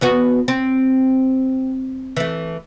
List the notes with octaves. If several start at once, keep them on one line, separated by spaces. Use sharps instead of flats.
E2 B3 F#4
C4
E3 A3